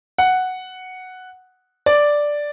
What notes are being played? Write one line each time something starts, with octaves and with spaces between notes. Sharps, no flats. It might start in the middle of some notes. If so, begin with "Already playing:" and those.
F#5
D5